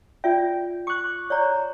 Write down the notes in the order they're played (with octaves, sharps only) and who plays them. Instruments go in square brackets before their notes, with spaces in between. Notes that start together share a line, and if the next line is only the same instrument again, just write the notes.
[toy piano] F4 D5 E5 [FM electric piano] G5
[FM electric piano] C#6 F#6 [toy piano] D6
[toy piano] C#5 D5 A#5